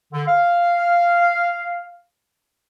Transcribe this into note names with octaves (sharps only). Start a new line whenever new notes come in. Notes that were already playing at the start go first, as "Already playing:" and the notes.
D3
F5